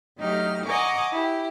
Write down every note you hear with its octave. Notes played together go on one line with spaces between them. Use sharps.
F#3 A3 D#4 G4 F6
D#5 F#5 G#5 A#5 C#6 D6
E4 G4